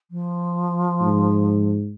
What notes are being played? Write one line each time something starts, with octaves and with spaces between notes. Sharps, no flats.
F3
G#2